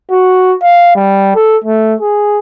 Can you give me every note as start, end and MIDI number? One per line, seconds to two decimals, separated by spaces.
0.11 0.55 66
0.62 0.92 77
0.95 1.30 55
1.35 1.57 69
1.64 1.94 57
2.01 2.39 68